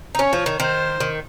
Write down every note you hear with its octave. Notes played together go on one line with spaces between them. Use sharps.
D#4
C#4 C#5
F3
D#3
D#3 C5
D#3